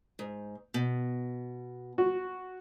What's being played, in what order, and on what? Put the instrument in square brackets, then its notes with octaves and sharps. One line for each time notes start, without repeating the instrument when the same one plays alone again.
[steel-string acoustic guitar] G#2
B2
[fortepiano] F#4